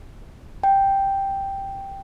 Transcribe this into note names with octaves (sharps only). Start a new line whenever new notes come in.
G5